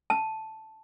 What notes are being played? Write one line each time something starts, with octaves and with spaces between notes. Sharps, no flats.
A5